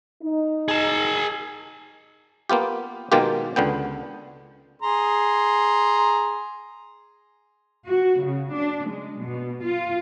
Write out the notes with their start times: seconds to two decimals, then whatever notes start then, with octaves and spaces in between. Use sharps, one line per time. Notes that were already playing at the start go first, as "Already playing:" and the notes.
0.22 D#4
0.68 G#4 A5
2.50 A#3 B3 F4 G4
3.12 B2 D#3 G#3 A#3 F4 G4
3.56 C#2 D3 B3 G5
4.82 G#4 A#5 C6
7.87 F#4
8.23 C#3
8.53 D4
8.88 G#3
9.23 B2
9.65 F4